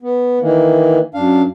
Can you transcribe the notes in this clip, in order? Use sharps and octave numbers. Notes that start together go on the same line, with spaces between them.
B3
D#3 E3 A#3
F#2 D4 F5